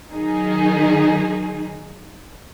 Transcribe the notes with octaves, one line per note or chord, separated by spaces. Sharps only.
D#3 F#3 D#4 G#4